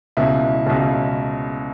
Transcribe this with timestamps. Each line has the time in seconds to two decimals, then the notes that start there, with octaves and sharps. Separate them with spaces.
0.17 C#2 B2 E4
0.66 C#2 B2